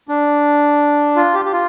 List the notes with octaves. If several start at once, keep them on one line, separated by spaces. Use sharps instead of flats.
D4
F4
G4
G4
F4